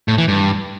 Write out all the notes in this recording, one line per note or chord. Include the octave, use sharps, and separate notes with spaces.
A2
E3
G2